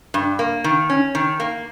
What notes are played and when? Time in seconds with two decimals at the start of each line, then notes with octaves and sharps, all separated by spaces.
0.14 G2
0.39 A#3
0.64 D#3
0.90 C#4
1.15 D#3
1.40 A#3